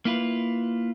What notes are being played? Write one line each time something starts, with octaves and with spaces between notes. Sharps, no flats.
A#3 E4 F4 B4